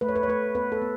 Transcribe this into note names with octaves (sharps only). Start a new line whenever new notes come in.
A3 B4
C#5
B4
C#5
A3 B4
B3 B4
A4
B3